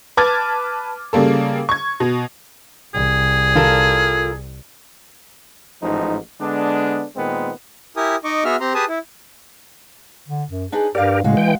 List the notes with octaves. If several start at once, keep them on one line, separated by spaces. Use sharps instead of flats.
B4 A5 D6 F6 G#6 A6
C#3 G3 A#3 A4
C#6 G#6
B2
C2 C3 G#4
F4 A4 A#4
A1 G#2 F3 D#4
D3 G#3 B3 D4
A#2 D#3 G#3 B3 C4
E4 G4 A#4 G#5 D#6
D#4 D#5 C#6 D6
B3 F#4 G#4 E5 F6
C4 G4 A#5 C6
G4 G#4 B4 G#5 A5 D#6
E4
D3
F#2
D4 D#4 G#4 B4
G2 G4 A#4 D5 F5
A2 C#3 G#3 F#4 F5
E3 G5